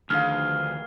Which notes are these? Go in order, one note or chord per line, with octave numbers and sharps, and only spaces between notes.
D2 D#3 F3 D4 G#4 F5 F6